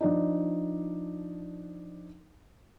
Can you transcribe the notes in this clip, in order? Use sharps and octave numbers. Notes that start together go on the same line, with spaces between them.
F3 D4 D#4